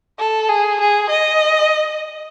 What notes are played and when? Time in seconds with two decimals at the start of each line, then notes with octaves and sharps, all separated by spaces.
0.18 A4
0.49 G#4
0.80 G#4
1.10 D#5